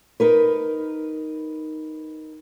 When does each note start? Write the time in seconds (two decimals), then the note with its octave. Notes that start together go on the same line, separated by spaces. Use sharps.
0.20 D#4 A#4 B4